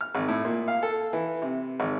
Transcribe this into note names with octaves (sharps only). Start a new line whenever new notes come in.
F6
G#1
A2
A#2
F5
A4
E3
C3
G#1